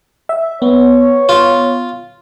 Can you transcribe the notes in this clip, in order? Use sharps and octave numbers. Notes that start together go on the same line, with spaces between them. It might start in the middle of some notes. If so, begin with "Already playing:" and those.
E5
B3 C#5
F4